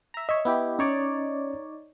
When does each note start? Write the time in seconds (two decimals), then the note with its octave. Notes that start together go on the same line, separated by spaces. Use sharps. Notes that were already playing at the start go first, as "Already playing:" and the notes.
0.14 E5 A#5
0.29 C#5 D#5 E5
0.45 B3 E4 G4
0.79 C#4 D#4 C#5 D5